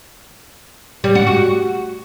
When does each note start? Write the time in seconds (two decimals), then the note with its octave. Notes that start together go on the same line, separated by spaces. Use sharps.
1.04 G3
1.15 F#4
1.27 F#4